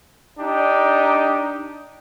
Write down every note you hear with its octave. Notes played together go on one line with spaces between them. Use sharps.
D4 D#4 G4